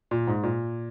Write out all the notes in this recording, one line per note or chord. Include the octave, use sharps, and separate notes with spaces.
A#2
G#2
A#2